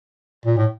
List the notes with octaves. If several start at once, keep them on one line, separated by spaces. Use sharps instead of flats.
A#2
A2